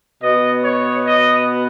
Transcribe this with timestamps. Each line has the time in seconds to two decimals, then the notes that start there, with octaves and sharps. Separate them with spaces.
0.21 B2 B3 D#5
0.63 C#5
1.06 D#5